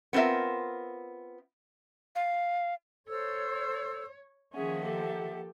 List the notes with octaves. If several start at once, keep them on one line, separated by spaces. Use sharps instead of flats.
B3 C4 F4 A#4 E5
F5
A4 C5 C#5 E6
D#3 F3 A#3 C#4 G#4 E5 F#5
G4 A4